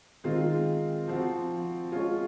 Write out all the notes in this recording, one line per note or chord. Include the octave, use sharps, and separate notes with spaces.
D#3 G#3 C4 F4
F3 C4 F#4
G#3 C#4 F4